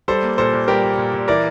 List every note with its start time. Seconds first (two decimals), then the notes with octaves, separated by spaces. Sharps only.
0.08 G3 A4 C5
0.23 A#3
0.38 A#2 A4 C5
0.53 A#2
0.68 G3 G4 A#4
0.83 A#3
0.98 A#2
1.13 A#2
1.28 E3 A#4 D5